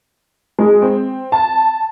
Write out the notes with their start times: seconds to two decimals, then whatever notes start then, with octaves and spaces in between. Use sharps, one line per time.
0.59 G#3
0.82 C4
1.32 A5